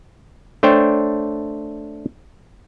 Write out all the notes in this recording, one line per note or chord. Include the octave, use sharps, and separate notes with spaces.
A3 D4 C5 C#5 G5